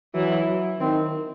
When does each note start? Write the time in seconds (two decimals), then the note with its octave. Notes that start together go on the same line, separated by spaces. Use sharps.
0.15 E3 F#3
0.47 F#3
0.80 D#3 C4